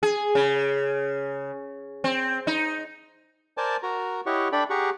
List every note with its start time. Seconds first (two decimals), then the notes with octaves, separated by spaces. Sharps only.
0.03 G#4
0.35 C#3
2.04 C4
2.47 D#4
3.57 A#4 C5 D5 G#5 A5
3.83 F#4 A#4 A#5
4.26 E4 G4 C#5 D#5 F#5 C#6
4.52 D4 A4 D5 E5 G5 B5
4.70 G4 G#4 F#5 A#5 C#6